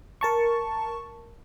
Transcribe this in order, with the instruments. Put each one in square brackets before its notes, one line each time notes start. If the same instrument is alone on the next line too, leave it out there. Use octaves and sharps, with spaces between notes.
[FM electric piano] A#4 A5 C#6